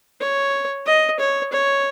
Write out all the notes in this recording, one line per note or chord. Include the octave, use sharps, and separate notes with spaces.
C#5
D#5
C#5
C#5